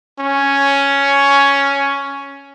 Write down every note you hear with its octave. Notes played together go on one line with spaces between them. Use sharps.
C#4